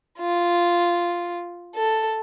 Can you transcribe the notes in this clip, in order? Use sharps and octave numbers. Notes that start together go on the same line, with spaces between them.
F4
A4